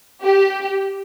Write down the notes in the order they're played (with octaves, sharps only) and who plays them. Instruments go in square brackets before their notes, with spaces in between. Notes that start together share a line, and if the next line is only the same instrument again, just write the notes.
[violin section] G4